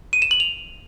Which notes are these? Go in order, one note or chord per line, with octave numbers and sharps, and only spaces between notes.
D#7
E7
F#7
F7